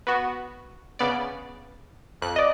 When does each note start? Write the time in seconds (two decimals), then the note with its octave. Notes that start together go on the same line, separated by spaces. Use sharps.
0.07 B3 F#4
0.99 C#3 B3 D5
2.22 F2 F#6
2.36 D5 D#5